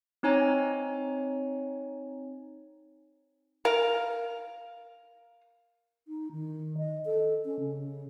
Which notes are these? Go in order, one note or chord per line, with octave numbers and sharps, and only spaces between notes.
C4 D#4 C#5 G#5 A#5
A#4 F5
D#4
D#3
D#5
A4
C#4
C#3